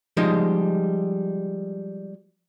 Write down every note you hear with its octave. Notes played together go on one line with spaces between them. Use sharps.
F3 G3 G#3 D#4 D#5